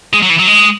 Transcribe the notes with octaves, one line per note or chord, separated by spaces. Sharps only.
G#3
F#3
E3
F#3
G#3